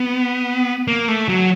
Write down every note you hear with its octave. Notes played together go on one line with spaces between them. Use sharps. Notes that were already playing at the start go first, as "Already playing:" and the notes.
Already playing: B3
A#3
A3
F#3